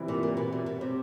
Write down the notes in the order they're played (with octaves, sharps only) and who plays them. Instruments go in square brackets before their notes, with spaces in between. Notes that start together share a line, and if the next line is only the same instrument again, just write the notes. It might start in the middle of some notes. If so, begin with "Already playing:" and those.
Already playing: [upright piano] C3 E3 G3 C4 E4
[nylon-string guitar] A#2
A#2
B2
A#2
B2
C3